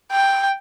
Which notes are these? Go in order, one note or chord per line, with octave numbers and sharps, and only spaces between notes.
G5